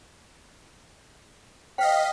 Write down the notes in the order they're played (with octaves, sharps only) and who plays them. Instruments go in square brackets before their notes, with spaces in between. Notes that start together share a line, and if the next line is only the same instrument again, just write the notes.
[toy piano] C5 G5 [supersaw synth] D#5 F5 B6